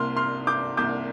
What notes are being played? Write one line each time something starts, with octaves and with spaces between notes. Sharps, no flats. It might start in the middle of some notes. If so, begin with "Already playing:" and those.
Already playing: C2 C3 A#3 C6 F6
C6 F6
D6 G6
C2 C3 A#3 D6 G6